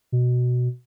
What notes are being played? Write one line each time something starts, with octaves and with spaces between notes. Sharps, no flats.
B2